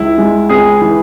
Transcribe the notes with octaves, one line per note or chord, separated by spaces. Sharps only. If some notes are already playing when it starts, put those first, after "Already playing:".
Already playing: C#2 E4
G#3
C#2 G#4
E3